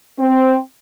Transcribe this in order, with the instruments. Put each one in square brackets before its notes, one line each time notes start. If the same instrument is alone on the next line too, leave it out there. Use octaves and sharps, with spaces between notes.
[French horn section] C4